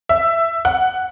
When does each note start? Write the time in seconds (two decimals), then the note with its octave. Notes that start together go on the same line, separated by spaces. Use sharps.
0.09 E5
0.65 F#5